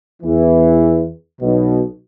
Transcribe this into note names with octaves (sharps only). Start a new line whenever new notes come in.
E2 E3
B1 B2